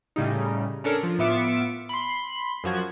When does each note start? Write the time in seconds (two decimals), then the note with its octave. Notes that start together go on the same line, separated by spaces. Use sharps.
0.16 A2 C#3 G3 D#4
0.84 C#4 D4 A4 A#4
1.03 F3
1.19 A2 B3 F4 E5 D6 C#7
1.89 B5 C6
2.64 F#2 F3 F#4 G#6